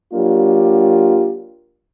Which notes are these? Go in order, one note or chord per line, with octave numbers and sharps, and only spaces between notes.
F#3 A#3 D4 F4 G4